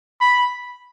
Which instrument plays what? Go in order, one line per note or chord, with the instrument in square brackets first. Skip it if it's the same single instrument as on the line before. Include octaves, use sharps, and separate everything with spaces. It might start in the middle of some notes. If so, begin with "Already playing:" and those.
[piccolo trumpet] B5